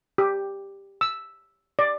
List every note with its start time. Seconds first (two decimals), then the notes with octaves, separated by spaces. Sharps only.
0.18 G4
1.01 E6
1.79 D5